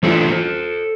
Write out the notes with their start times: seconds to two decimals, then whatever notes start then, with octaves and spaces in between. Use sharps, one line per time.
0.03 E3 A3 D4 F4 A4 C5